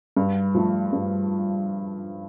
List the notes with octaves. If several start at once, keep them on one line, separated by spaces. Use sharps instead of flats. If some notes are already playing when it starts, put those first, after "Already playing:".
G2
F3 A3
G2